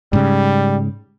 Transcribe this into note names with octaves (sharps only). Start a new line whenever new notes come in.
G#2 C#3 G3